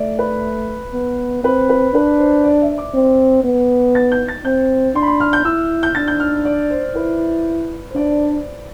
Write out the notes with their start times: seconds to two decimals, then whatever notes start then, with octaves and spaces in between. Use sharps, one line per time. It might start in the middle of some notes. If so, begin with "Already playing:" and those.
Already playing: A3 D5 E5
0.19 B4
0.93 B3
1.44 C4 B4
1.70 B4
1.94 D4 B4
2.19 C5
2.44 D5
2.62 E5
2.78 D6
2.94 C4
3.44 B3
3.95 A6
4.12 G6
4.28 A6
4.45 C4 G6
4.95 D4 C6
5.02 B5
5.07 C6
5.20 F6
5.33 G6
5.45 E4 E6
5.83 G6
5.95 D4 A6
6.08 G6
6.20 F6
6.45 D5
6.70 C5
6.95 E4 B4
7.90 C5
7.95 D4 D5